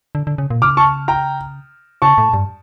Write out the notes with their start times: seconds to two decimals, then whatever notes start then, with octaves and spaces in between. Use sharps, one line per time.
0.15 D3
0.27 D3
0.38 C#3
0.50 A#2
0.62 C#3 D6 F6
0.77 A5 C#6
1.08 G5 A#5
2.02 C#3 A5 C#6
2.18 A2
2.34 G2